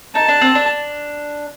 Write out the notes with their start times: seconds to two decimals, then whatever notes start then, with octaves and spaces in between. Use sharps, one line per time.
0.15 D#4 A5
0.28 D4
0.41 C4
0.55 D4